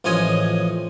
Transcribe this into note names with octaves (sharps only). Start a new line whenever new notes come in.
A1 F3 G#3 C#5 D#5 G#5